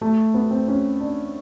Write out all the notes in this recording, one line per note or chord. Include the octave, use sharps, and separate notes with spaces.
A3
B3
C4
C#4
D4